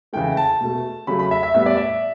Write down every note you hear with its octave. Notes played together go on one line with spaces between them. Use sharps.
C#3 E3 A3 G5
A5
B2 A3
C#3 F#3 A3 B5
B5
E5
E5
A2 G3 B3 E5
D5
E5